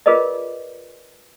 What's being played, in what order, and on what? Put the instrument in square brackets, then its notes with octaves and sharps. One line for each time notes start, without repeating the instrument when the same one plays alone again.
[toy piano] F4 G#4 A#4 B4 D5 D#5